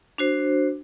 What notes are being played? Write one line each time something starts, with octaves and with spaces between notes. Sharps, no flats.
D4 F#4 C5